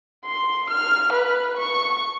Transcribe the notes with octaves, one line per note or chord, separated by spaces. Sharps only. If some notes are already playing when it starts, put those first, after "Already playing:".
C6
F6
B4
C#6